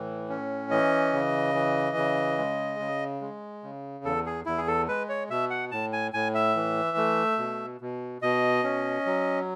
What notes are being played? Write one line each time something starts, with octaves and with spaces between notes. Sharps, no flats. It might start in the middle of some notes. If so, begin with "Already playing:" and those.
Already playing: A2 E3
C#4
E3 D#5
C#3
E3
C#3
G#3
C#3
G#3
C#3
E2 A4
G#4
E2 E4
G#4
A4
G#3 B4
C#5
B2 E5
F#5
A2 A5
G#5
A2 G#5
E5
E3
A3
B2
B2
B2 D#5
C#4
F#3